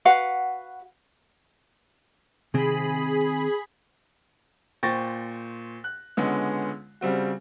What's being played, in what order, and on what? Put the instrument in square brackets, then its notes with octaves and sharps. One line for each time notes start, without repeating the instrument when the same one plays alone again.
[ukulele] F#4 B4 F5 F#5
[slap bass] C3 D#3 C4 [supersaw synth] G#4 B5
[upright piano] A#2 C5 G5 C#6 A6 A#6
F#6
C#2 D3 G#3 B3 C#4
C#3 G3 C4 F#4